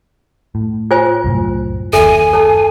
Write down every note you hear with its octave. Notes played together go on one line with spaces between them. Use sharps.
A2
F4 C5 G#5
C2 F#2 A2
F#1 D#2 A4 E5 G#5
A4 A5